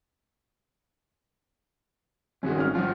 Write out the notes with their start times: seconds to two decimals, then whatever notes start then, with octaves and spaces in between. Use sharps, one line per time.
2.43 G2 D#3 G#3 C#4 F#4
2.56 G#1 C#4 F6
2.75 F3 G3 F4